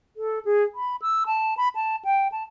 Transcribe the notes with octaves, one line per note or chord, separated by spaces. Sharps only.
A4
G#4
B5
E6
A5
B5
A5
G5
A5